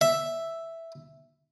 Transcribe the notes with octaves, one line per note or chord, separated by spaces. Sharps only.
E5